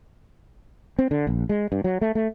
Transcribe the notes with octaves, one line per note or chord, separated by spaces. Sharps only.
C4
D3
A#1
G#3
G2
F#3
A3
A3